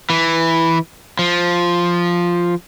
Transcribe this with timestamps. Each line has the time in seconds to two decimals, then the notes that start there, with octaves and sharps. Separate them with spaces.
0.10 E3
1.19 F3